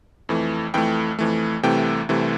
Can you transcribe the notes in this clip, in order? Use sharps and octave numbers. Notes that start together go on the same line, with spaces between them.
F2 E3 A3
F2 E3 A3 G5
F2 E3 A3
C2 C3 E3 A3 G5
C2 C3 E3 A3